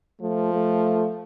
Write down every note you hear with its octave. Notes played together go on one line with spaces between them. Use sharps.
F3 A3
A3